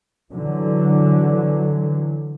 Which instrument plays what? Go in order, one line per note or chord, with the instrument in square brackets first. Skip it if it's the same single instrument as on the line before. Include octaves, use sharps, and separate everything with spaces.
[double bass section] D3 E3 F#3